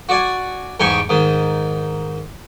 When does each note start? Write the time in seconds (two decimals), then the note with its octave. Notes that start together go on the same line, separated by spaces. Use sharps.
0.09 F#4 D5 G#5
0.80 E2 G#2 G4 G5 G#5 C#6
1.09 G#2 D#3